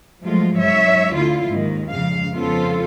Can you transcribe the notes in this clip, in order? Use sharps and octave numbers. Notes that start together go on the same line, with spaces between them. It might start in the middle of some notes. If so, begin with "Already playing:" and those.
F3 F#3 G#3 A3 F4
G#2 F#3 C#5 E5
D2 D3 E4 F4
D#2 G#2 D#3
F2 G#2 C#3 F5
F2 C#3 B3 F4 A4 C5